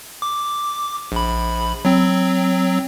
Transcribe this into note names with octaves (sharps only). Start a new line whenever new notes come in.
D6
A#1 B5
F#3 C4